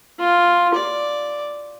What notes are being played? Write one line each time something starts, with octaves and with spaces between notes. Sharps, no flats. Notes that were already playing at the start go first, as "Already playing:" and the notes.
F4
D5